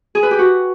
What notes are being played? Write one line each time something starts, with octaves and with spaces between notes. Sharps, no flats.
G#4
B4
G4
F#4